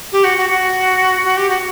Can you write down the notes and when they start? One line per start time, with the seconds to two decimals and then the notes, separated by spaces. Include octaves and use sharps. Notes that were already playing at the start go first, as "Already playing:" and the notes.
0.12 G4
0.24 F#4
0.38 F#4
0.50 F#4
1.24 F#4
1.37 G4
1.50 F#4